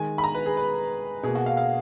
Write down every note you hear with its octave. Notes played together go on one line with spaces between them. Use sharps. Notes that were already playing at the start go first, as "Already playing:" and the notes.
Already playing: D#3 G#3 G#5
B5
A#5
B4
G#4
B4
B2 A#3 G#4
F#4
F5
F5